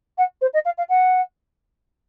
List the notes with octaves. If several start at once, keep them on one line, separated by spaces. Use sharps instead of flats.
F#5
C5
D#5
F5
F5
F#5